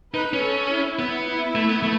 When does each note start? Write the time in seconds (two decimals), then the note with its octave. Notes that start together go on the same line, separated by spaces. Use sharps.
0.14 D#4 B4
0.33 C#4
0.42 A4
0.71 E4
0.99 B3
1.28 E4
1.55 A3
1.69 B3
1.83 A3